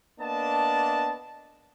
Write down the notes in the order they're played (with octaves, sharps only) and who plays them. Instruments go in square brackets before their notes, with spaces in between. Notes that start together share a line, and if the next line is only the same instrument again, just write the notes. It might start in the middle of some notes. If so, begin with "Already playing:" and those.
[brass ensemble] A#3 B3 D4 D#5 A5